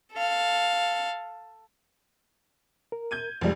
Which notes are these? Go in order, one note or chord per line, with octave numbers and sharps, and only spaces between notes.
A4 F5
A#4
G6 G#6 D#7
F1 F2 F3 G3 G#3